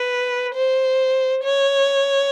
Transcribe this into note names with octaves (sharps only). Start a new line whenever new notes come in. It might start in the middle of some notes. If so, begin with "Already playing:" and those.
Already playing: B4
C5
C#5